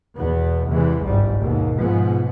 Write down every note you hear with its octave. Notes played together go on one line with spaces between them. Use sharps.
E2 B2 B3
E2 C3 E3 G#3
G1 C2 G#2 G3
D#2 G#2 B2
G#2 B2 F3 G#3 B3